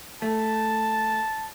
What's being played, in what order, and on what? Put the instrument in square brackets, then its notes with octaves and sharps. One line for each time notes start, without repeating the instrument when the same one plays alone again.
[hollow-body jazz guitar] A3 [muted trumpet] A5